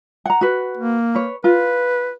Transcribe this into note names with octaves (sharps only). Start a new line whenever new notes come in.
F#5 A#5
F#4 B4
A#3
B4 C#5
F4 B4